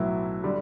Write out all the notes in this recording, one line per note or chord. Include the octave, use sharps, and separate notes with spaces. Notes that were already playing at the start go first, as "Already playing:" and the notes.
Already playing: B1 A2 F#3 B3 E4
D3 G3